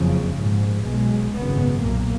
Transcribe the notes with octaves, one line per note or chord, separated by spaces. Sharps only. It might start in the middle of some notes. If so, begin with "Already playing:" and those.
Already playing: F#1 F2 C#3 F3
A#1 G#2
B1 B2 G#3
G#1 F#2 C#3 B3
B1 A#2 A#3